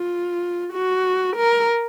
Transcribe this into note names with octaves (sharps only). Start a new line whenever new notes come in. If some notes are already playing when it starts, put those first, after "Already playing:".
Already playing: F4
F#4
A#4